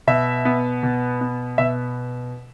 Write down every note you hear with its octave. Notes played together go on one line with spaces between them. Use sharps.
B2 E5
B3
B2
B3
B2 E5